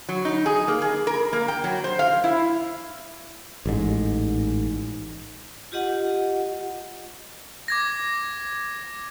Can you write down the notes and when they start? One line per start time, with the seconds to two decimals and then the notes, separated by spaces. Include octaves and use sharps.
0.09 F#3
0.25 D#4
0.46 G#4
0.68 A#3
0.82 G#4
1.07 A#4
1.33 A#3
1.48 G5
1.64 F#3
1.84 C5
1.99 F5
2.24 E4
3.65 A1 G#2
5.72 F4 G4 D#5 F#5
7.68 D6 G#6 A#6